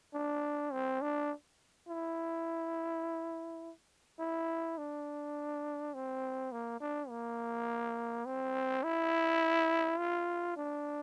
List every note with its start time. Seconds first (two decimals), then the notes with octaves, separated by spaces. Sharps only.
0.14 D4
0.72 C4
1.01 D4
1.88 E4
4.20 E4
4.78 D4
5.94 C4
6.52 A#3
6.81 D4
7.09 A#3
8.26 C4
8.84 E4
9.99 F4
10.57 D4